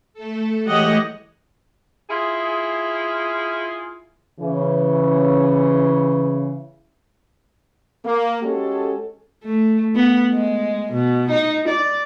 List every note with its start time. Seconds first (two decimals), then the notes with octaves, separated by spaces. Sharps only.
0.14 A3 A4
0.66 E3 G#3 A3 G4 C#5 D#5 F#5
2.10 E4 F4 G#4
4.40 C#3 E3
8.05 A#3
8.43 G#3 C#4 F#4 G4 A4
9.44 A3
9.95 B3
10.32 G#3
10.93 B2
11.30 D#4
11.68 D5